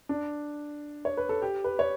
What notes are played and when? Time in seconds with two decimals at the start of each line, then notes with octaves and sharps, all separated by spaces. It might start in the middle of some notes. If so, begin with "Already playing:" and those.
0.09 D4
1.05 C#5
1.17 B4
1.29 A4
1.42 G4
1.64 B4
1.79 C#5